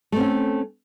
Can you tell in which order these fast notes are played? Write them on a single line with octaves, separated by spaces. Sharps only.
A3 C4 C#4